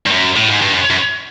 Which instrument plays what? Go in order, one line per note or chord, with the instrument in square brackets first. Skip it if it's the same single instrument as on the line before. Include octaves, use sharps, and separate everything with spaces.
[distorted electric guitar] G2
F#2
A2
G#2
G2
F#2
F#2